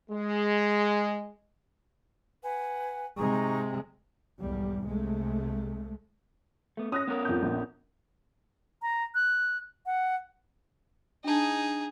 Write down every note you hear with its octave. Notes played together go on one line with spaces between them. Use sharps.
G#3
B4 F#5 G#5
C3 G#3 D#4 A#5 C#6
B1 E2 G#2 G3
C2 C3 G#3 A3
A3 B3
C#4 D#6 F#6 A#6
B3 C#4 A#4
F2 G6
A#1
A#5
F#6
F#5
D4 D#4 G#4 A5